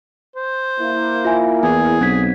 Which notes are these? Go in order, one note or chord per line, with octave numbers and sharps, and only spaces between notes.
C5
A#3 E4
F4 E5 G#5
E2 G#4 G#5
B1 C4 G#6 B6